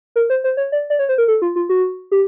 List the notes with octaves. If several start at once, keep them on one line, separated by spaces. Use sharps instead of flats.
A#4
C5
C5
C#5
D5
D5
C#5
C5
A#4
A4
F4
F4
F#4
G4